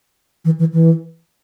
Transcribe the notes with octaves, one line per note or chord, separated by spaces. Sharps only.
E3
E3
E3